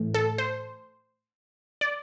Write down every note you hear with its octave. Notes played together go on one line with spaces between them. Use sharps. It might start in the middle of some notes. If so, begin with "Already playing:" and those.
Already playing: A2 E3 A3
A4
C5
D5